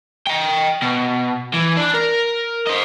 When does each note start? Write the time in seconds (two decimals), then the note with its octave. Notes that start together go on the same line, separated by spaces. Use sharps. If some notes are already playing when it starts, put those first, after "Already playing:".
0.27 D#5 G5
0.82 B2
1.54 E3
1.77 D4
1.94 A#4
2.67 C5 D#5